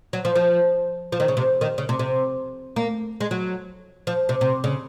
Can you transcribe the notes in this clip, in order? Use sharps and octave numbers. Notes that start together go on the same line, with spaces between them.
F#3
F3
F3
F3
D#3
C#3
C3
D#3
C#3
C3
C3
A#3
G#3
F#3
F3
C3
C3
C#3